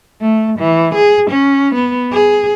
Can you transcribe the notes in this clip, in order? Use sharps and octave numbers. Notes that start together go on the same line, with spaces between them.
A3
E3
G#4
C#4
B3
G#4